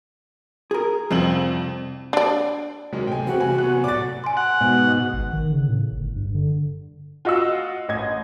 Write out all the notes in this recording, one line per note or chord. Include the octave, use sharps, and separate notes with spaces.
G#4 A#4
C2 F2 C4 F#7
D4 D5
C3 D#3 F#3 G#3 A#3
A2 G5 G#5
E3 C4 F#4 G#4
G3 G#5
F#3 B3 F#6
A2 D5 D6 A6
G#5 C6
F#5
G#2 B2
G#1
D#3
C#3
A2
G1
G2
D3
F4 F#4 D#5 F#5 E6
A1 D#5 G#6